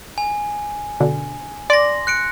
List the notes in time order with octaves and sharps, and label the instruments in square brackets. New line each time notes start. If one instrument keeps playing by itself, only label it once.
[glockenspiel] G#5
[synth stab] B2 D3
[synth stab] D5 [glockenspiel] C6 A#6
[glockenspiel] F#6 C#7 D7